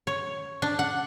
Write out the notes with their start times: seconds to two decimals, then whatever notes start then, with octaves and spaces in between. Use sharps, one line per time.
0.07 C#5
0.62 D4
0.79 F#5